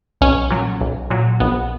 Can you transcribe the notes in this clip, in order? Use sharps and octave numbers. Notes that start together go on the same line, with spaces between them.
B1 C#4
A#2 F#3
B1
A#2 F#3
A#1 B3